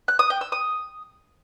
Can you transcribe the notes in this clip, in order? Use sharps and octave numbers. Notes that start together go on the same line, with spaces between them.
F#6
D#6
G5
E6
D#6